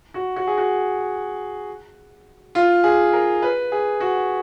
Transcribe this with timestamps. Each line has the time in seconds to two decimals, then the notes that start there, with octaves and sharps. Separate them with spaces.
0.14 F#4
0.36 F#4
0.47 G#4
0.58 F#4
2.55 F4
2.84 G#4
3.13 A#4
3.42 B4
3.72 G#4
4.00 F#4